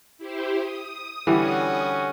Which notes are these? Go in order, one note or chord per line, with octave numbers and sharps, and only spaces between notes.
E4 G4 C5
D#6
D3 E3 G3 C#4 F#4